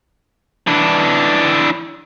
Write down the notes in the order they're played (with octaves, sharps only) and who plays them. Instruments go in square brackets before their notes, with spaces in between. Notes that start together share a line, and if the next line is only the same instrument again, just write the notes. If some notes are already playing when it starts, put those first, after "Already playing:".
[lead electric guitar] E3 D4